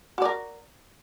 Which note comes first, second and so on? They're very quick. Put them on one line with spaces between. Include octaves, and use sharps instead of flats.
F#4 D5 A#4